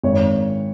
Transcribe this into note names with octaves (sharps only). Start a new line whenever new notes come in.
G#1 C#5